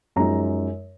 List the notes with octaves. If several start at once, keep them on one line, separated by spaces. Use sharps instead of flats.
F#2 F3 G#3 D#4 A#5